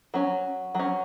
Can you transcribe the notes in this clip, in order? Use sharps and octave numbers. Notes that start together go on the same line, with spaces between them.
F#3 C#4
F#3 C#4